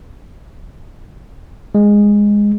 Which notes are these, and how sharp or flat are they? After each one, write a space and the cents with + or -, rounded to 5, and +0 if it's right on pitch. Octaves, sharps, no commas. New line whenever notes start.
G#3 -10